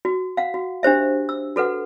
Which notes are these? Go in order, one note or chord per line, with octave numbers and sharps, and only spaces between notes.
F#4
F5 F#5
F#4
D4 G4 C5 E5
E6
F#4 A4 B4 F#5